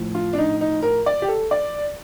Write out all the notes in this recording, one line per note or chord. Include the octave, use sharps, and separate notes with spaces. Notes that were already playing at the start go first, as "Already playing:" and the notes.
Already playing: A2 F3
F4
D4
D#4
D#4
A#4
D5
G4
A4
D5